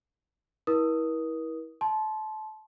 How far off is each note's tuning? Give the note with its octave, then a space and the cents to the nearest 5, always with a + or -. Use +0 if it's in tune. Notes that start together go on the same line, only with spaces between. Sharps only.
E4 -25 A#4 +45 D#6 +0
A5 -25 C6 +0